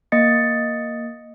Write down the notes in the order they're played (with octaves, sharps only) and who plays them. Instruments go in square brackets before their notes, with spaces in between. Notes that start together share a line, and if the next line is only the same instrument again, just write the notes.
[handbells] A#3 D#5 A6 C#7